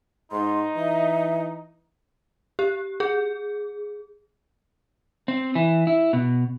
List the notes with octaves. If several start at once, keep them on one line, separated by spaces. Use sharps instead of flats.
G#2 D#4 C6
E3 E5
G4
G#4
C4
E3
E4
B2